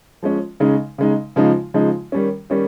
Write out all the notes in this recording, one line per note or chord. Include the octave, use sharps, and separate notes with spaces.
F3 G#3 C#4
C#3 G#3 D#4
C#3 G#3 D#4
C#3 F3 G#3 D#4
C#3 F3 G#3 D#4
D#3 G3 C#4
D#3 G3 C#4